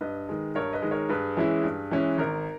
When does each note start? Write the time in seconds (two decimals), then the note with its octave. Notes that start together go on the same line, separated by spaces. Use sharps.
0.01 G2 B4 D#5
0.29 D#3 G#3
0.55 G2 A#4 C#5
0.73 B4 D#5
0.82 D#3 G#3
0.91 A#4 C#5
1.09 G2 G#4 B4
1.37 E3 G#3 C#4 E4
1.64 G2
1.91 E3 G#3 C#4 E4
2.18 G#1 A#4